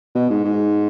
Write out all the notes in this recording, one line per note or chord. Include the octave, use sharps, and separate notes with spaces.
B2
G#2
G#2